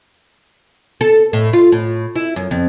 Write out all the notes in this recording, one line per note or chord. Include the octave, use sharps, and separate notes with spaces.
A4
A2
F4
A2
E4
F#2
F2